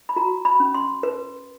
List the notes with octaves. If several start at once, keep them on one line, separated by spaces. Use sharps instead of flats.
B5
F#4 A#5
B5
C#4
C6
B4